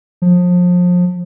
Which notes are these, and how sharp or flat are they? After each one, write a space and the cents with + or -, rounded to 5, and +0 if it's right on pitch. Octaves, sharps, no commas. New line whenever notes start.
F3 +30